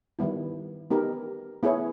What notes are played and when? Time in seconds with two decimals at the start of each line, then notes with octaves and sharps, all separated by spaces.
0.19 D#3 G3 B3 E4
0.91 B3 D#4 G4 A#4
1.63 B3 E4 G#4 C#5